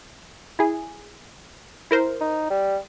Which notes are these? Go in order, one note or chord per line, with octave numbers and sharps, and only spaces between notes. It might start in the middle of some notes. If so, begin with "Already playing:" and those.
E4 G#4
E4 A#4 C5
D#4
G3